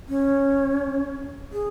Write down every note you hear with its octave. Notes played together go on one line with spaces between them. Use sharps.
C#4
G#4